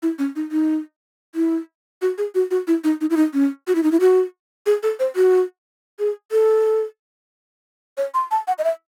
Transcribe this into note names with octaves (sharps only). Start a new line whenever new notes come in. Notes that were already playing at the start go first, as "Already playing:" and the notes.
E4
C#4
D#4
D#4
E4
F#4
G#4
F#4
F#4
E4
D#4
D#4
E4
D#4
C#4
F#4
E4
D#4
E4
F#4
G#4
A4
C5
F#4
G#4
A4
C#5
C6
A5
F#5
D#5
E5